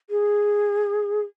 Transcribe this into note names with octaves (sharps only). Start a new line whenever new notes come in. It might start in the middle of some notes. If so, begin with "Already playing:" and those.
G#4